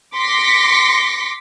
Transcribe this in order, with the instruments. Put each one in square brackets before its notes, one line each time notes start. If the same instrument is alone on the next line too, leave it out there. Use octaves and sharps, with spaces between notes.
[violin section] C6 D6 A#6 B6 C#7